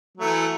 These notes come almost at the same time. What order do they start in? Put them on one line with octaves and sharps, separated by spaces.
F#3 A3 E3